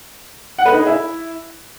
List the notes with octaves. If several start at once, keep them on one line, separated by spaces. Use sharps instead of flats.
F#5
B4
D#4
G#4
E4